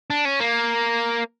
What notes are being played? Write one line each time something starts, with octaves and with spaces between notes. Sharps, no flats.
D4
C#4
A#3